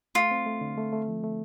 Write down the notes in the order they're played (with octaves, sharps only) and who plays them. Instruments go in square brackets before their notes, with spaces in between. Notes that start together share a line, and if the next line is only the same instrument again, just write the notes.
[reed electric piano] A3 [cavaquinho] F4
[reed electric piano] C4
A3
D3
A3
A3
F3
A3